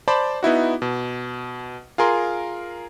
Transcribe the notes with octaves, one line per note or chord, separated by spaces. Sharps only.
C5 D5 A5 B5 D6
B3 D#4 E4 F#4
B2
F4 G#4 A#4 C6